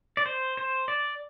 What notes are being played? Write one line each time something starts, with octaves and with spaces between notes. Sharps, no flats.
D5
C5
C5
D5